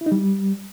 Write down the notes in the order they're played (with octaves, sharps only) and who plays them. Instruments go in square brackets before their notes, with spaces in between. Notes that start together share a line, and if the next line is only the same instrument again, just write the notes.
[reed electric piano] E4
D#4
G3